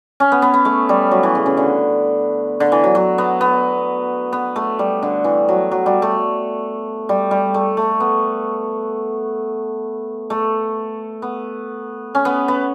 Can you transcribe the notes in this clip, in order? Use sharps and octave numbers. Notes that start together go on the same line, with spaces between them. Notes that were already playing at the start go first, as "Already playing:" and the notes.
C#4
B3
B3
B3
A3
G3
F#3
E3
C#3
C#3
D3
D3
E3
F#3
F#3
B3
B3
B3
A3
G3
D3
E3
F#3
F#3
G3
A3
G3
G3
A3
A3
B3
A3
B3
C#4
B3
B3